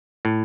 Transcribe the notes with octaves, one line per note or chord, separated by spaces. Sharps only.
A2